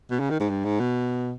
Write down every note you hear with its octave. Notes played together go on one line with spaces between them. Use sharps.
B2
C#3
D#3
G#2
G2
G#2
B2